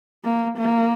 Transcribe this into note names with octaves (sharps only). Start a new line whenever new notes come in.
A#3
A#3